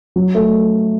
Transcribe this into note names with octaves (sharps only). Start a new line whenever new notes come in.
F#3
A3